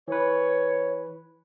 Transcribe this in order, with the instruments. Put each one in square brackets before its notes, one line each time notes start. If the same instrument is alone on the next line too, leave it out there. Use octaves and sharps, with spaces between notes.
[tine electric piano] E3 B4 [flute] C#5